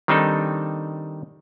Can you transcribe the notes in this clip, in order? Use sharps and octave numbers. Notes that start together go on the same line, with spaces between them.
D#3 G3 C4 D4 D#4 A4